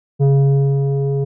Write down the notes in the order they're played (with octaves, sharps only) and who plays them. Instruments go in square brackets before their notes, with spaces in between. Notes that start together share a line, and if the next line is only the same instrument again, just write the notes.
[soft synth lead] C#3